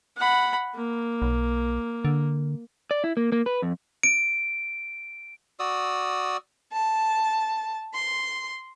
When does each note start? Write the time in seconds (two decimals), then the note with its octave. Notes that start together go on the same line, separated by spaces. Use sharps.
0.17 F#5 B5
0.75 A#3
1.22 B1
2.05 D3
2.91 D5
3.04 E4
3.17 A#3
3.32 A#3
3.46 B4
3.62 F2
4.03 D7
5.59 F#4 D5 D#6 E6
6.73 A5
7.95 C6